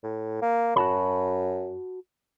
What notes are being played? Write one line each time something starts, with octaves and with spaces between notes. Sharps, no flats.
A2
A#3
F#2 F#4 A5 B5